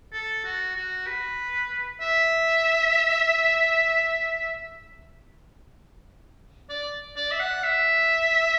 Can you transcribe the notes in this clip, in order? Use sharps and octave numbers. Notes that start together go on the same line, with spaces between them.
A4
F#4
F#4
B4
E5
D5
D5
E5
F#5
E5